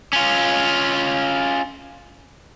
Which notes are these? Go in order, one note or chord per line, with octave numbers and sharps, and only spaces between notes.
C#4 F4